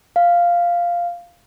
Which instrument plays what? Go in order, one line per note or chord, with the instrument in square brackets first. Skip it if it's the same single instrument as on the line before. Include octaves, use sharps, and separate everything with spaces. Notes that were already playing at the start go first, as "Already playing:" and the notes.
[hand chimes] F5